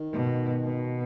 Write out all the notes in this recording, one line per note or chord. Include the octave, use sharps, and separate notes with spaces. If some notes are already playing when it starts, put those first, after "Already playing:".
Already playing: D#3
B2
B2